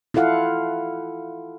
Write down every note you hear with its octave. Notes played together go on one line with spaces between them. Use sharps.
E4 F4 A4 F5 F#5